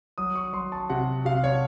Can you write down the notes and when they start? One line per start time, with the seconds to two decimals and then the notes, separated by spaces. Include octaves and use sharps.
0.18 F#3 D#6
0.35 C#6
0.53 F#3 C6
0.72 A5
0.90 C3 F#5
1.25 C3 F5
1.44 C#5